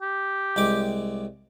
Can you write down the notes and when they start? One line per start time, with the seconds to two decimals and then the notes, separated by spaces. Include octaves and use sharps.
0.02 G4
0.56 C2 G#3 D6